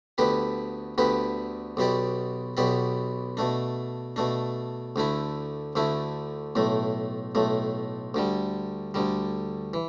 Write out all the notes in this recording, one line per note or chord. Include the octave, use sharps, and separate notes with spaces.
D2 D3 B3 G4 B4
D2 D3 B3 G4 B4
B1 B2 B3 G4 D5
B1 B2 B3 G4 D5
B2 A3 D4
B2 A3 D4
D2 D3 A3 E4
D2 D3 A3 E4
B1 A2 A3
B1 A2 A3
D2 D3 G3
D2 D3 G3
E3